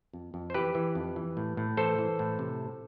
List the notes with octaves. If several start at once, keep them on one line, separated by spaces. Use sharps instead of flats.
F2
F2
C5
E3 G4 B4
E3
F2
E3
A2
A2
E3 A4 C5
E3
A2
C3